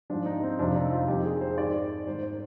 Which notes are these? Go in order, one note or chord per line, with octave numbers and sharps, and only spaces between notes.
G#2 F3 D4
D#4
C4
F2 C3 F3 D4
D#4
F4
F2 D#3 G4
G#4
C5
G#2 D#3 D5
G#2 D#3 C5
C5